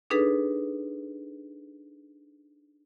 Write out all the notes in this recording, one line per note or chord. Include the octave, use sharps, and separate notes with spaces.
D4 D#4 G#4 A4 B4